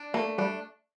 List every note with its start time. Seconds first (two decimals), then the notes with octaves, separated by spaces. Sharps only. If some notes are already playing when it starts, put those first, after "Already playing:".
Already playing: D4
0.14 A3 A#3
0.38 G3 D4